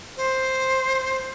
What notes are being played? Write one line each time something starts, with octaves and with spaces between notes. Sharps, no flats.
C5